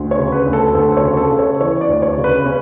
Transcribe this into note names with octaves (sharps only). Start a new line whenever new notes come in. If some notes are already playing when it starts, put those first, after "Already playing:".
Already playing: D2
C#5
C#3
B4
D2
A4
D2 A4
C#5
C#3
A4
C#3
C#5
E3 C#5
D5
D2
C#5
C#3
B4
C#3 C#4